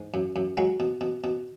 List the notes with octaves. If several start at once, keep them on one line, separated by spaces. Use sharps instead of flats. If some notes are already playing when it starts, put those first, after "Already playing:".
Already playing: G#2
F#2
F#2
F#3 G#3 F#4
B2
B2
B2